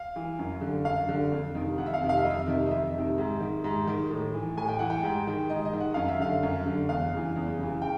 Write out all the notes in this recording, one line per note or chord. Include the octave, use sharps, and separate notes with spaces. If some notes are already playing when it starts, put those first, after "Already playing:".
Already playing: F5
E3
F#2
D3
F#2 F5
D3
F2
C3 D#3
F2 F#5
E5
F5
C3 D#3
F5
E5
F2 D#5
E5
C3 D#3
D#5
F2 E5
C3 D#3
G#2
D#3
G#2
D#3
A2
E3
A2 G#5
G5
E3 F#5
G5
G#2
D#3
G#2 D#5
D#5
D#3
F#5
F#2 F5
E5
D3 F5
F#2
D3
E2 F5
C#3 E3
E2
C#3 E3
G5